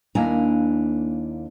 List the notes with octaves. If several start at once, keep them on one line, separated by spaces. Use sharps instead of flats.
D#2 A#3 D4 E4 G#5 A#5